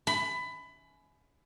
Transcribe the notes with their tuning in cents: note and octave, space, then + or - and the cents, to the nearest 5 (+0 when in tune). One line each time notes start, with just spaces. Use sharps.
B5 +20